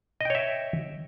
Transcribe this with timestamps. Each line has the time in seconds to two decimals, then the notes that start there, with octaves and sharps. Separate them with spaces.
0.21 D#5
0.25 G5
0.30 C#5
0.35 E5